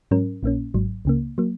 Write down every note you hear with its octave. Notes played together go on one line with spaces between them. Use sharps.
G#2 F#3 C#4 A#4
A#1 A#2 A#3 C#4
G#1 G#2 F#3
C#2 C#3 A#3
F#3 A#3